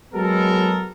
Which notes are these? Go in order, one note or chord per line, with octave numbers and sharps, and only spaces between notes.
F#3 G#3 B3 A4 A#4